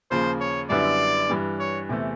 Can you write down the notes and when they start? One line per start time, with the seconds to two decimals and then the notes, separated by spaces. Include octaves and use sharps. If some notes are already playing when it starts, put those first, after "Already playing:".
0.11 D#2 C#3 F3 C5
0.41 C#5
0.70 F#2 D3 G3 B3 E4 D5
1.30 G2 E3 G3
1.60 C#5
1.89 E2 C3 E3 A3